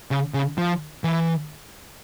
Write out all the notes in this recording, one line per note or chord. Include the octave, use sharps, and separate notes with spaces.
C#3
C#3
F3
E3